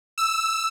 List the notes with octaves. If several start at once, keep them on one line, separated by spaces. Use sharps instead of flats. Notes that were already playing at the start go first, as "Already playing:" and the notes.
E6